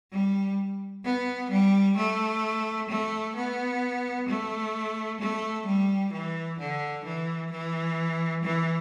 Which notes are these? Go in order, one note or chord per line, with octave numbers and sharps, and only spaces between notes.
G3
B3
G3
A3
A3
B3
A3
A3
G3
E3
D3
E3
E3
E3